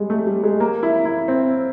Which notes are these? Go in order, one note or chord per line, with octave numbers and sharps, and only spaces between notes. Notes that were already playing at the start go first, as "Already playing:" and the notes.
Already playing: G3 G#3
A3
G3
G#3
A#3
E4
E4
C4